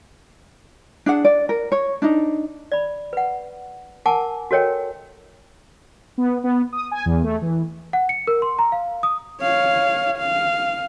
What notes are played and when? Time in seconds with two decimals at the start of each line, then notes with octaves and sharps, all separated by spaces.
1.06 D4 G#4 F#5
1.25 D5
1.49 A#4
1.72 C#5
2.02 D4 D#4
2.72 D5 B5
3.13 B4 F#5
4.06 A#4 F#5 G#5 A5 D6
4.51 F#4 A4 A#4 C#5 D#5 G5
6.18 B3
6.44 B3
6.73 D#6
6.91 G#5
7.06 E2
7.24 A3
7.42 E3
7.93 F#5
8.09 C#7
8.27 A#4
8.42 C6
8.59 A#5
8.72 F5
9.03 D#6
9.42 C#5 F5
10.18 F5